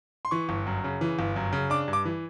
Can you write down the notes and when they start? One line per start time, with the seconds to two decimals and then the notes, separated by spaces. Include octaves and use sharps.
0.25 C6
0.31 E3 C#6
0.49 G1
0.66 F#2
0.84 C#3
1.01 E3
1.19 G1
1.36 F#2
1.53 C#3
1.70 D4 D6
1.88 G2
1.93 D6
2.05 E3